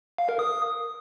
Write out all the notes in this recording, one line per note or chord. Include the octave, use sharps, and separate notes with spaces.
F5
A#4
D#6